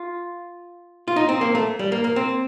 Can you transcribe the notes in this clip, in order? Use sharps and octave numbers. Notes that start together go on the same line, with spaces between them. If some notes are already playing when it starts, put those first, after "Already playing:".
Already playing: F4
F4
D#4
C4
A#3
A3
G3
A#3
A#3
C4